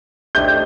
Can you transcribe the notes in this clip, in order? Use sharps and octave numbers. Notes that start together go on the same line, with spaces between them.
A3 D4 G4 C5 D#5 G6